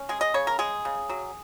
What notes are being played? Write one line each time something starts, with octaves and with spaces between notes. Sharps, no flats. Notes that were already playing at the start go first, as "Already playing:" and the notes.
Already playing: C#4
G#3 G#4
D#5
C#3 C#5
A#4
G#3 G#4
C#3
F#3